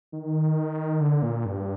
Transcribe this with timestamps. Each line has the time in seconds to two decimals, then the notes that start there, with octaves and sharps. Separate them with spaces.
0.12 D#3
1.01 D3
1.22 A#2
1.45 G2